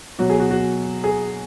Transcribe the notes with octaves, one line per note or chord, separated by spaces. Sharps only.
B2 F#3 F#4
G#4
F#4
F#4
G#4